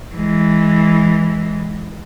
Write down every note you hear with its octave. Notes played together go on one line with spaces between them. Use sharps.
E3 G#3